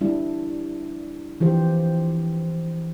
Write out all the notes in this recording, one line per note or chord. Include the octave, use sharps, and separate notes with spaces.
G3 D4 E4
E3 F3 G4 C5